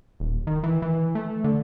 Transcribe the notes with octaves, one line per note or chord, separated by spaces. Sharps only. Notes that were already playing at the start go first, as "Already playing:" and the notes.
D#1
D#3
E3
E3
A3
D3